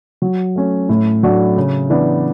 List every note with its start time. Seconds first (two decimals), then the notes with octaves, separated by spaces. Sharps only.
0.22 F#3
0.56 A3 C#4
0.89 A2
1.23 F#3 A3 D4 F#4
1.57 C#3
1.90 E3 B3 D4